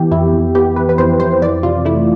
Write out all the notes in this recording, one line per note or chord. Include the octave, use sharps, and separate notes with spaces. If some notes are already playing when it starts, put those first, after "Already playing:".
Already playing: E3 B3 G4
F2 E4
F2
B3 G4
E3 B4
B4
F2 C5
F2 C5
E3 D5
C3 F4
A3 E4